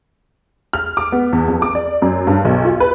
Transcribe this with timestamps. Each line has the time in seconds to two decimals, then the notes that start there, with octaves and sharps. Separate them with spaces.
0.73 F6
0.97 D6
1.12 B3
1.33 E2
1.48 F2
1.62 D6
1.75 D5
2.02 F#2
2.27 G2
2.45 B1
2.65 F4
2.80 B4